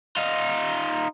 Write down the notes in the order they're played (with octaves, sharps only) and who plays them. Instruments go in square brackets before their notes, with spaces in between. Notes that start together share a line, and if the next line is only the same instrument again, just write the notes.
[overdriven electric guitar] D#4 F4